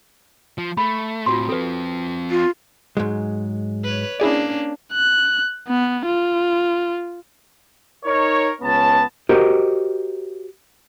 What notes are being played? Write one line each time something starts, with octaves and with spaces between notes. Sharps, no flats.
F3
A3 B5
A2 C4 F4 F#4 C6
F3 C4 A4 B4
F4
G#2 F#3 G#3
B4 C#5
A#3 C#4 D4 E4 G#4 D5
F#6
B3
F4
D#4 A#4 C#5
C#2 B3 C#4 A5
F#4 G4 A#4 C5 D#5